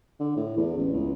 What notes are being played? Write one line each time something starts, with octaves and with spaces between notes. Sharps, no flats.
D3
A2
E2
A1
C#2